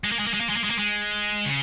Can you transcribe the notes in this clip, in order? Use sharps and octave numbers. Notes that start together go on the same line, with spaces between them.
G#3
A#3
G#3
A#3
G#3
A#3
G#3
A#3
G#3
A#3
G#3
C#3